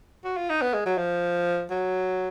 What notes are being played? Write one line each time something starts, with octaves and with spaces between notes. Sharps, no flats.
F#4
F4
D#4
B3
G#3
F#3
F3
F#3